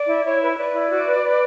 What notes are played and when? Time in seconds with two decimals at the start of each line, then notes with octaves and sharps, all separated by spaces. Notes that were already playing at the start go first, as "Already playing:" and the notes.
Already playing: D5
0.08 E4
0.24 E4 C#5
0.42 B4
0.50 C#5
0.57 B4 D5
0.73 E4
0.90 F#4
1.06 B4
1.23 B4